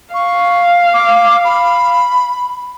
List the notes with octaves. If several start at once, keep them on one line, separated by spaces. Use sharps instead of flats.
F5 C#6
D6
B5